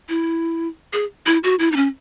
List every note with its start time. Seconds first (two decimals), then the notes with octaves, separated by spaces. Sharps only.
0.09 E4
0.93 G#4
1.26 E4
1.43 F#4
1.59 E4
1.72 D#4
1.76 C#4